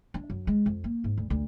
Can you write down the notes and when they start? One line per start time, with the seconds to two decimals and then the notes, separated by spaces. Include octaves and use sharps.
0.14 D4
0.30 F#2
0.47 G#3
0.66 F2
0.84 A#3
1.04 G#2
1.17 D2
1.30 D2